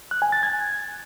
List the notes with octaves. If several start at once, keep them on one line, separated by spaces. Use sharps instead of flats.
F#6
G#5
A6
G#6